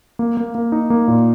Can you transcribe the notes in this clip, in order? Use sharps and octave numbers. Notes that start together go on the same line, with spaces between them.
A#3
A#3
A#3
D#4
A#3
A#2